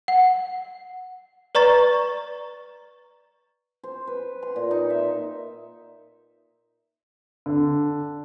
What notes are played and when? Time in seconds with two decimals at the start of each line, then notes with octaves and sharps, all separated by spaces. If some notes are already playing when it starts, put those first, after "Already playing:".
0.08 F#5
1.55 B4 D5 A#5 C#6 A6
3.84 C5
4.07 B4
4.43 C6
4.56 A#2
4.71 D#4
4.90 E5
7.46 D3